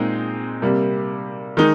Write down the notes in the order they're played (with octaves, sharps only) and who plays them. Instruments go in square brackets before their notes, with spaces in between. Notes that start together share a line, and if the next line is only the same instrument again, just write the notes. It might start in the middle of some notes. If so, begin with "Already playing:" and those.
Already playing: [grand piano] A#2 G#3 C4 D#4
C3 G3 A#3
D#3 G#3 D#4